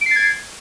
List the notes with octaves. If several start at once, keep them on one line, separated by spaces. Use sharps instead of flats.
G#6 A6 C7 D7